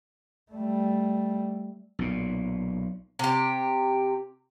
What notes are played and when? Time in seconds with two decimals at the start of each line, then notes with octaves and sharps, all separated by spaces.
0.52 G3 A3
1.99 B1 A#2
3.19 C3 G4